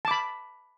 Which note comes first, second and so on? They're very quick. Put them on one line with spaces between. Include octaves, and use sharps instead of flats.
A5 D6 B5